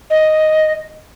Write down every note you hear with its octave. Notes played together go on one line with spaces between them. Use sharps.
D#5